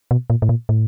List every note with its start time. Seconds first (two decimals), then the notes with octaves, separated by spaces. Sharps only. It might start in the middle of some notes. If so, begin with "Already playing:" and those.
0.11 B2
0.30 A#2
0.42 A2
0.49 A#2
0.69 A2